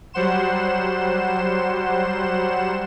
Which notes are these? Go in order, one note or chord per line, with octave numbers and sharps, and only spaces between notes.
F#3 G3 C5 F#5 C6 E7